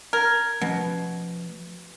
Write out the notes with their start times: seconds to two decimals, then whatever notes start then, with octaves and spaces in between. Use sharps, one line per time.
0.13 A#4 G#6
0.61 B2 F3 A3 C#4